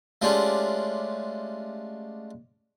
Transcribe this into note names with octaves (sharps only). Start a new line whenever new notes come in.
G#3 A3 C#4 D4 F4 G4